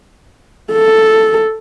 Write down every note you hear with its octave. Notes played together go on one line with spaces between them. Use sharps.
A4